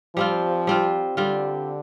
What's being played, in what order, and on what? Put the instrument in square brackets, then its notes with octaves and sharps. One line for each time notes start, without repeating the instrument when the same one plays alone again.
[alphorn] F3 [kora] G3 C4 F4
[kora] G3 C4 F4
[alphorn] D3 [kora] G3 C4 F4